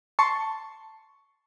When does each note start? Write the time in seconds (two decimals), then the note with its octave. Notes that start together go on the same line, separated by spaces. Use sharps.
0.19 A5 C6 C#6